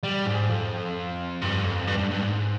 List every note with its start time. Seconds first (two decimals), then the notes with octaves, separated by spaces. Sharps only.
0.03 G3
0.26 G#2
0.49 F2
1.41 G2
1.64 F2
1.87 G2
1.98 G2
2.10 G2
2.21 G#2